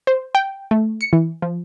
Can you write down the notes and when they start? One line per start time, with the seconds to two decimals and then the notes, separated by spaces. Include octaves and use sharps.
0.07 C5
0.35 G5
0.71 A3
1.01 C#7
1.13 E3
1.42 F3